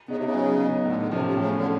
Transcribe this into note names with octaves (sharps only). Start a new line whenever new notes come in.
C#3 B3 D#4
C3
C#3
F#3
B3 D#4
A2 D3
D#3
C3 F3 A3 C#4
C3
A2 C#3
D3
C#4